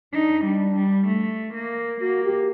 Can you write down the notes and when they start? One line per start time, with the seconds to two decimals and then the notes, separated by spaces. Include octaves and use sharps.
0.13 D4 D#4
0.44 G3 D4
0.76 G3
1.07 A3
1.54 A#3
2.01 A#3 F#4
2.24 G4